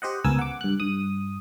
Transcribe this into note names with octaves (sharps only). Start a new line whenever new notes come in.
G4 C5 D#5 F#5
C#2 B3 A#4 G#5 E6
F#5 D6
G2 F#6
G2 D#6